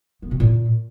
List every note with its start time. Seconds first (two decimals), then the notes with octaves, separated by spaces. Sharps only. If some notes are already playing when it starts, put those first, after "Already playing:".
0.22 B3
0.31 B2
0.40 A#2